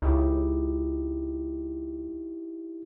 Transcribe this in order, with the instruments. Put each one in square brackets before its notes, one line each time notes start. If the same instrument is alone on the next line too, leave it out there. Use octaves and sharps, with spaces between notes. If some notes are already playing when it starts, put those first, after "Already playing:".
[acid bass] C#2 [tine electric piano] D#4 E4 G4